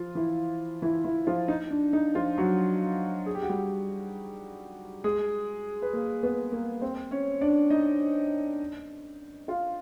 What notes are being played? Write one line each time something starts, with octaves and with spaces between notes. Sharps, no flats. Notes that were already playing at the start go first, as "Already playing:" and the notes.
Already playing: F3 F4
E3 E4
E3 E4
E3 E4
F3 F4
D#4
D4
D#4
F3 F4
F#3 F#4
G#4
G4
F#4
G3 G4
G#3 G#4
B4
A#3 A#4
B3 B4
A#3 A#4
C4 C5
C#4 C#5
D4 D5
D#4 D#5
F4 F5